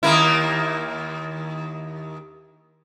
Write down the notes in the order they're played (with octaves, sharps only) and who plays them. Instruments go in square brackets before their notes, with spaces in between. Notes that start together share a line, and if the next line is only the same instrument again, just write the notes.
[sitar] D#2 A#3 E4